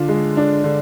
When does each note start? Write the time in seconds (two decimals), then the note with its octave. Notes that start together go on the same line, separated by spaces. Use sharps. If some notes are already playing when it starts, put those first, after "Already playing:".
Already playing: D3 D4 F4
0.09 G#3
0.37 D4
0.64 D3